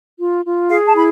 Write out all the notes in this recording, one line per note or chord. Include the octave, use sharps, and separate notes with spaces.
F4
F4
G#4 F5
A5
E4 B5